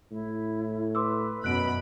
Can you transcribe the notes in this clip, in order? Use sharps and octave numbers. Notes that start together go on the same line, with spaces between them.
A2 E4
B4 C6 D6 E6
F#2 B2 B5 F#6 D7